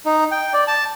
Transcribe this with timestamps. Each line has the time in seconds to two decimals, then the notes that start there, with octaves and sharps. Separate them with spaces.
0.06 D#4
0.32 G5
0.53 D5
0.68 A5